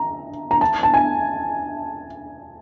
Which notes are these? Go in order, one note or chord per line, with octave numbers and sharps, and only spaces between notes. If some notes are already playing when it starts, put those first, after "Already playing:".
Already playing: A#5
A#5
A5
A5
G#5